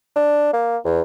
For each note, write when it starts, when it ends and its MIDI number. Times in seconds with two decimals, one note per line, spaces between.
0.16 0.53 62
0.53 0.77 58
0.85 1.01 40